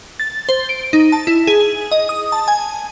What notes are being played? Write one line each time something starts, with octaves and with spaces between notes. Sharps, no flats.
A6
C5
D7
D#4
A5
E4
G#4
D#5
D#6
A5
G#5